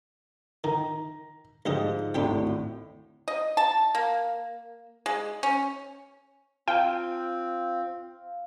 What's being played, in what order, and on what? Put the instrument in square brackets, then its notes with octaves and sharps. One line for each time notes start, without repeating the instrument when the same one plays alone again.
[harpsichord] D#3 [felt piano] A#5
[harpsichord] D2 G4 D#5 [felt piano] G#2 F3
[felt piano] G#1 D2 A2 [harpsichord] D4 G4 G5
[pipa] D#5
A5
A#3
G#3
C#4
[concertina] C4 [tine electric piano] F4 [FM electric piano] F5 [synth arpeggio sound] G5